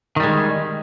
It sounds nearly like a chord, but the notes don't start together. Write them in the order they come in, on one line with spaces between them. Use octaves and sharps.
D#3 G3 G#3